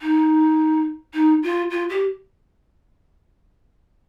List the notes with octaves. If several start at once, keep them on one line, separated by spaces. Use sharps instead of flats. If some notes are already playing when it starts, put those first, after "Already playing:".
D#4
D#4
F4
F4
G4